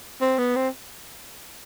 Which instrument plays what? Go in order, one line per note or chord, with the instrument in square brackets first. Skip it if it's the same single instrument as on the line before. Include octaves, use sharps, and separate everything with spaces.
[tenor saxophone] C4
B3
C4